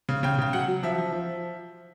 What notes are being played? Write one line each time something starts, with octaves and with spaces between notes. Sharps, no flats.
C#3
C#3 G5
C#3 G5
F#3 F#5
F#3
F3 E5
F3
F3